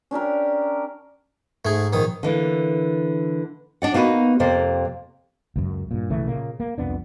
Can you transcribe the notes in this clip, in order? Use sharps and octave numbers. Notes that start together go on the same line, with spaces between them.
C#4 D4 G4 A#4
G#2 A3 G#4
A#1 D#3 D#6
D3 E3 A#3
D4 D5 F#5
A#3 B3 D#4 F#4 B4
F2 C3 A#3 C5 D5
C#2 F#2
G2 A#2
B1 C#3 E3 A3
A#2 C#3 A#3
A#3
C2 F2 B3 D4